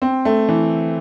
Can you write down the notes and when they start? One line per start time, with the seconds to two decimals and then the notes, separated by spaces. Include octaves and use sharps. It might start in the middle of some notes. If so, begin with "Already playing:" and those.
0.02 C4
0.25 A3
0.49 E3